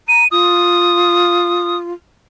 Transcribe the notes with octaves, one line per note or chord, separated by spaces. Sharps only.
A#5 D#7
F4 D#6